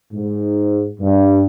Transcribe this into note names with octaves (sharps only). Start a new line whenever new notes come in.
G#2
G2